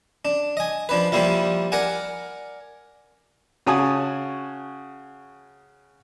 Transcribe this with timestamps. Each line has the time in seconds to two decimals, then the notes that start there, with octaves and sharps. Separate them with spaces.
0.25 D4
0.57 D#5 G#5
0.89 F3 D4 B4
1.12 F3 G3 A#3 E4 F4
1.72 A#4 D5 F#5 G#5
3.67 C#3 F#4 C#5 G#5 A5 D#6